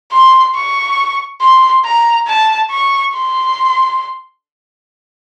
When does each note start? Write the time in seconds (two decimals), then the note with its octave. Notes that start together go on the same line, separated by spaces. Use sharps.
0.12 C6
0.54 C#6
1.41 C6
1.84 A#5
2.27 A5
2.70 C#6
3.14 C6